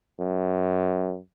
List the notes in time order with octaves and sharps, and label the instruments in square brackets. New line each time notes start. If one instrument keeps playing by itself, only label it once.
[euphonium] F#2